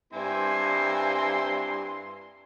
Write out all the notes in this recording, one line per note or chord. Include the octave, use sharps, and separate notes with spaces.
G2 C4 E4 G#5 A#5 C6